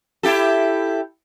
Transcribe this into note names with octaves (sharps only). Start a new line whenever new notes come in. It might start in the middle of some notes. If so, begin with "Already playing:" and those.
E4 G4 A4